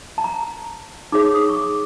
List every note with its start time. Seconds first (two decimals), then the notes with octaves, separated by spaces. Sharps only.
0.18 A5
0.24 A#5
1.12 D#4 G#4 C#5 D6
1.34 D#6
1.49 C#6
1.56 D6